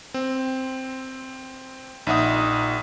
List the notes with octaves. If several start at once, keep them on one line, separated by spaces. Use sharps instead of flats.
C4
A#1 D#4 E5 F#5 D#6